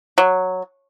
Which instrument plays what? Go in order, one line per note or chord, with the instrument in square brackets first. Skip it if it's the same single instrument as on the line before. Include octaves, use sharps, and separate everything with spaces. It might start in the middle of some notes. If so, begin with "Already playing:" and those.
[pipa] F#3